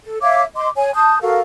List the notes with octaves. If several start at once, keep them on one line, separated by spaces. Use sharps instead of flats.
A4
C#5 E5 F5 D6
D#5 C6 D6
C#5 G#5
A5 D#6 G6
F#4 A4 A#4 F5